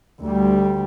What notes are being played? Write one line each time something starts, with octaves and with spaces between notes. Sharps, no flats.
D2 G3